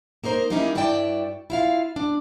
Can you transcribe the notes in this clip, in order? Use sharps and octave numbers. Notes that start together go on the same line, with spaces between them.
A#3 D#4 A#4 C5
C#3 G3 A#3 C#4 D#4 E4
G2 E4 F#4 D5 G5 A5
E4 F4 F5
D4